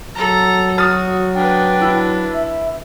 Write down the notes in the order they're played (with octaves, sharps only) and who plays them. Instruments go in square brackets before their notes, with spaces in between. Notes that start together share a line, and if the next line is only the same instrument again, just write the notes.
[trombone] F#3 [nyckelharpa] A4 A#5
[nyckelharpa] F#4 [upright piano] D#6 F6 A6
[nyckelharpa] D4 B4 [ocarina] G5
[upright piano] E4
[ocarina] E5